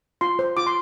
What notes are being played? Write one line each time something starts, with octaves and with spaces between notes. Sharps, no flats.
F4 C6
C5
F4 D6
C6